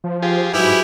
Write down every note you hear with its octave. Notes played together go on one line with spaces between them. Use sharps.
F3
F4 G4 G#4
G#2 F#3 E4 G4 G#4 B4 F6